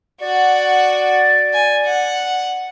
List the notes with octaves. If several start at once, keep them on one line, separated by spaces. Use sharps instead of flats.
F#4 D5 F#5
G#5
F#5